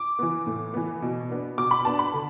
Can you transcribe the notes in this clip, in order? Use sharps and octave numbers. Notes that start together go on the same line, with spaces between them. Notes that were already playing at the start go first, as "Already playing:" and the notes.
Already playing: D6
E3 B3
A2
E3 B3
B2
B3 D4
B2 D6
B5
B3 D4 A5
B5
D3